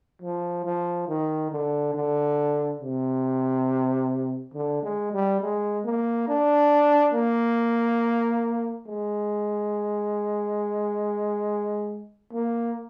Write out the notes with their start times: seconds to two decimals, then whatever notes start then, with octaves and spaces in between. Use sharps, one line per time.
0.22 F3
0.64 F3
1.08 D#3
1.51 D3
1.94 D3
2.81 C3
4.54 D3
4.83 G#3
5.13 G3
5.40 G#3
5.84 A#3
6.28 D4
7.14 A#3
8.87 G#3
12.33 A#3